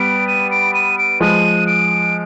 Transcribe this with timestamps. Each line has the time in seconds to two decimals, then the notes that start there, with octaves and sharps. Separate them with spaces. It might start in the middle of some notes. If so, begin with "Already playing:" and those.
Already playing: G3 B3 D7
0.27 D#7
0.51 D7
0.74 D#7
0.98 D7
1.20 F3 G#3 D#7
1.67 D7